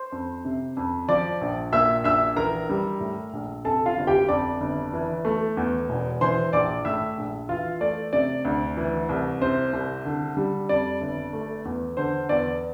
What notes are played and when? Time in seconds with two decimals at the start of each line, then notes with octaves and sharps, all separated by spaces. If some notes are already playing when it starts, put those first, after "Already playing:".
Already playing: C5 C6
0.12 F2
0.45 C3
0.77 F2
1.09 F3 D5 D6
1.41 A#1
1.73 A#2 E5 E6
2.04 A#1 E5 E6
2.36 E3 A#4 A#5
2.69 G3
3.00 A2
3.33 A#1
3.65 C3 A4 A5
3.86 F4 F5
3.97 G1
4.07 G4 G5
4.28 F2 D5 D6
4.61 G1
4.93 E3
5.25 A3
5.57 E2
5.89 E1
6.21 E3 C5 C6
6.53 A#1 D5 D6
6.85 A2 E5 E6
7.17 A#1
7.49 E3 F4 F5
7.80 A3 D5
8.13 C3 D5
8.45 D2
8.77 E3
9.09 C2
9.41 C3 C5
9.73 C2
10.05 D3
10.37 G3
10.69 F2 D5
11.01 G1
11.33 A3
11.65 E2
11.97 D3 C5
12.29 E2 D5